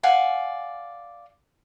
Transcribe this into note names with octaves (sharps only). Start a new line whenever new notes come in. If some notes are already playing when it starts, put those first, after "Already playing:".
D5 F5 F#5 G#5